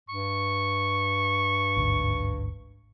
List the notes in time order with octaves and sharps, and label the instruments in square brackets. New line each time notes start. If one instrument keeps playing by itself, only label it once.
[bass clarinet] G2 [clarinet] C#6
[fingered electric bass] G#1 D2 G#2